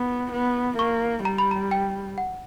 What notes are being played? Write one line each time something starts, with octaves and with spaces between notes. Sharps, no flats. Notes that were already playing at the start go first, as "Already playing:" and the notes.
Already playing: B3
B3
A#3 C#6
G3 A#5
B5
A#5
G5
F#5